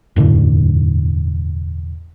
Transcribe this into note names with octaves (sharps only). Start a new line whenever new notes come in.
E1 F#2 A2 D3